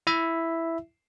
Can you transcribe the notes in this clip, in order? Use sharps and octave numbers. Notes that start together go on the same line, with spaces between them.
E4 E5